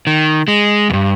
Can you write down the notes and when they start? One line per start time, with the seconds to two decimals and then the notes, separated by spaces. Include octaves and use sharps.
0.07 D#3
0.48 G#3
0.90 E2 G2